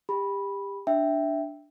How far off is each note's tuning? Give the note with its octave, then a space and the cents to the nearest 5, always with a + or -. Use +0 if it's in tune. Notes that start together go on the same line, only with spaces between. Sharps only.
G4 +25 B5 -10
D4 +0 E5 +0 G5 +0